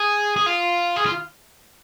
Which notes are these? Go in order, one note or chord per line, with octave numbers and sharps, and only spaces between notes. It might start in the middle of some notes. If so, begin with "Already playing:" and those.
Already playing: G#4
G#4
F4
G#4
F4